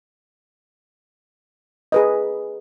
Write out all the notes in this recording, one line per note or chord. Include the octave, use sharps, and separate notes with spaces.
G#4 B4 D#5